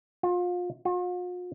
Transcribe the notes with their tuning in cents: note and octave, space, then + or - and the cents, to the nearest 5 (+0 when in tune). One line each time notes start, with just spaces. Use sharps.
F4 +30
F4 +45